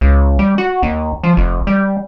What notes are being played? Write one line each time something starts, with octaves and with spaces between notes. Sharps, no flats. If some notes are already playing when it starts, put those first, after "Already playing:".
C#2
G3
F#4
D#2
F3
F1
G3